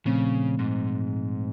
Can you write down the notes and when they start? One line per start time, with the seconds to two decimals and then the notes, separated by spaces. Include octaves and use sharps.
0.05 A#2 C#3 F3 A3 C4
0.59 G#2